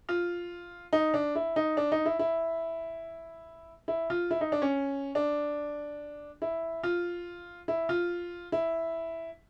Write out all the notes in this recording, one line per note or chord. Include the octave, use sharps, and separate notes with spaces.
F4
D#4
D4
E4
D#4
D4
D#4
E4
E4
E4
F4
E4
D#4
D4
C#4
D4
E4
F4
E4
F4
E4